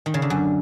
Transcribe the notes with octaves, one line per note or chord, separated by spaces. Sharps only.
D#3
C#3
D3
F#2